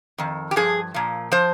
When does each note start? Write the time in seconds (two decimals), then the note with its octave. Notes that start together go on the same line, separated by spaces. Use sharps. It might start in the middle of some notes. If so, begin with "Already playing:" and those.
0.18 F2 D#3
0.51 G4
0.56 G2 F3 G#4
0.94 A#2 F3
1.32 F3 C5